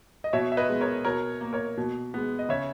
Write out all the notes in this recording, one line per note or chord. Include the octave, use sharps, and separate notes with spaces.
D#5
B2 C#5 E5
E5
B4 D#5
G#3 B3
A#4 C#5
B2 A#4 C#5
A#3
A#4 C#5
B2
G#3 B3
D#5
C#3 C#5 E5